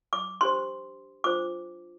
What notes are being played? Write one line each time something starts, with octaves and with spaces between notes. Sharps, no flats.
D6
D4 G4 C5 C6
D4 F4 C5 D6